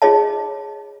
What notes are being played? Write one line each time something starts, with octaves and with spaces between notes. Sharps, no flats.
F4 G#4 C#5 D#5 A5